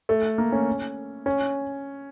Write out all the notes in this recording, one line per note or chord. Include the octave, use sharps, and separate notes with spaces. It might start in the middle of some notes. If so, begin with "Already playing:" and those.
A3
A#3
C#4
C#4